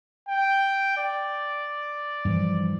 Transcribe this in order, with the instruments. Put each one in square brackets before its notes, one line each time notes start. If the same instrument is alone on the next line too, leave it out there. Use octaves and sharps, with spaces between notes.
[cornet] G5
D5
[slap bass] G2 E3 F3